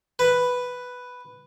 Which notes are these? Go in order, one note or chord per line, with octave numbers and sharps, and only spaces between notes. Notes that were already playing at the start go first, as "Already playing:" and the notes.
B4